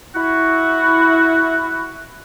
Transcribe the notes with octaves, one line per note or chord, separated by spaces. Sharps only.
E4 F#4